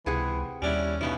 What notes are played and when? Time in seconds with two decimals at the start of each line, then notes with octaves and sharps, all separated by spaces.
0.06 C#2 C3 E3 G#4 F#5
0.62 D#2 G3 C#4 D4 E4
1.01 G2 B2 E3 B3 D#4